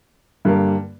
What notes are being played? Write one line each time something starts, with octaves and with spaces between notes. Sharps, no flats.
G2 D3 G3 A#3